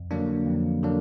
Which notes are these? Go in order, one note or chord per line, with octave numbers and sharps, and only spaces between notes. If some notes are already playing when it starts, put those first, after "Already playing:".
Already playing: F2
D3 F#3 A#3 D4
F2
D3 F#3 A#3 D4